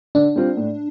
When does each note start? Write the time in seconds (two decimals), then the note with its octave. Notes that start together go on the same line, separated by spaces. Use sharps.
0.15 D3 D4
0.36 G3 C4 F4
0.57 A2